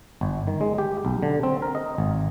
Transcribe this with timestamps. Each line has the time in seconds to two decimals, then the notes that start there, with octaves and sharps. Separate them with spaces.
0.21 G1
0.47 D#3
0.61 G#3
0.78 G4
1.05 B1
1.23 D3
1.43 C4
1.62 A#4
1.75 D#5
1.98 G#1